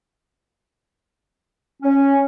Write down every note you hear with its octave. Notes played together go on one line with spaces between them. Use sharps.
C#4